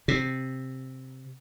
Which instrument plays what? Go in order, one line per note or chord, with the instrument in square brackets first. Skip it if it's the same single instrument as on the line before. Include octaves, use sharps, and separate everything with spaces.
[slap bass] C3